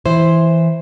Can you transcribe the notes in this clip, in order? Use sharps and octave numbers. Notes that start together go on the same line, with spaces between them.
E3 E4 C5